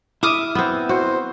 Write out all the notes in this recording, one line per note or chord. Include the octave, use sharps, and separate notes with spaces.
E4 E5 D6 D#6 F6
B3 C4
F#4 C5